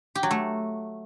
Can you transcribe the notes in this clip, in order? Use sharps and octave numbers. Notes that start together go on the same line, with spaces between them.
G4
F#3
A3